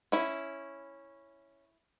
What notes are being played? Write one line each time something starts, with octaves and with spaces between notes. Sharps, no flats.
C#4 E4